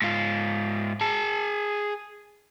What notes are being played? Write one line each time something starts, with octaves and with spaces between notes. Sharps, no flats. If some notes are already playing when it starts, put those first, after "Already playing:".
G#2 F4
G#4 A5